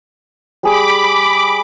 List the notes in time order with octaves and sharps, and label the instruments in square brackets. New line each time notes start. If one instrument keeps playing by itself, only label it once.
[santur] G3 G#4 [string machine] B5 D6